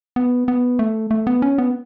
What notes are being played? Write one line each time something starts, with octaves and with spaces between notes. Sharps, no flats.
B3
B3
A3
A3
B3
C#4
B3